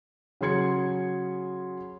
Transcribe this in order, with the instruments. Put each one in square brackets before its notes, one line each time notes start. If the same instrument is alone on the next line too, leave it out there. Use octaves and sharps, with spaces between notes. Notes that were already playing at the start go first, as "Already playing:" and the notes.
[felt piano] C#3 F#3 G#4 C6 G#6 C#7